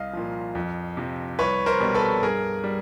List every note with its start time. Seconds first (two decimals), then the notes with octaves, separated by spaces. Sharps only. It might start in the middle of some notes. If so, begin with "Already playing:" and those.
Already playing: C2 D#5 F5
0.13 A#2 F3
0.55 F2
0.97 C3 F3
1.39 C2 B4 C#5
1.66 A#4 C5
1.80 B2 G3
1.94 A4 B4
2.23 G2 G#4 A#4
2.64 G3